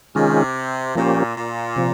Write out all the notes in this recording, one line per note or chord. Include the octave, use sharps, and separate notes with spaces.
C3 D#3 G#3 C#4 F4 G#4
A#2 F3 A#3 C#4 G4
A#2
C3 F3